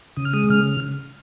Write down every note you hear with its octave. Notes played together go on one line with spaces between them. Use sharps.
C#3 D#6
F6
G#3 D#6
C#3 F6